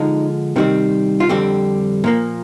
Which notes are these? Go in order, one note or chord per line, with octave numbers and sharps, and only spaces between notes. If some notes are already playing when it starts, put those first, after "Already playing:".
Already playing: D3 F3 G#3 D#4
C3 D#3 G3 C4
F4
F2 D3 G3 C4 G4
A#2 F3 A#3